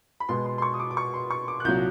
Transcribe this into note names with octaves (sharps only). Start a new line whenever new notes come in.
B5
B2 G#3 B3 C6
C6
C6
C#6
D#6
D6
D6
C#6
C6
C#6
D6
F#6
C2 A#2 F#3 G6